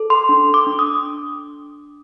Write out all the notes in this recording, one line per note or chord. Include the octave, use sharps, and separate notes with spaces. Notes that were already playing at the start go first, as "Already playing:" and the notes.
Already playing: A4
C6
D4
D6
D4
D#6